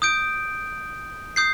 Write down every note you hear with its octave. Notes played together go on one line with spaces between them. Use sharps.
D#6 G6 D7
D#6 G6 C7